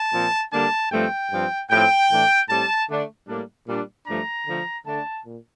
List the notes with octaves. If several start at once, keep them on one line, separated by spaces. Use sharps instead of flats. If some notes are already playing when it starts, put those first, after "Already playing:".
Already playing: A5
A#2 F3 C4
D3 G3 A#3 D4 A5
G2 F3 A3 C4 G5
G2 F3 C4
A2 F3 C4 G5
A2 E3 A3 D4
A2 G3 C4 A5
D3 A3 D4
A2 G3 A#3 D4
A#2 G3 D4
G2 F3 A3 D4 A#5
D3 F3 A3
D3 A3 D4 A5
A#2